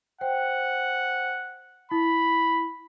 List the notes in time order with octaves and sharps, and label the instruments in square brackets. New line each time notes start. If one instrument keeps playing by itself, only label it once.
[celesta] C5 G5 [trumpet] F#5
[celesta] E4 [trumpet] B5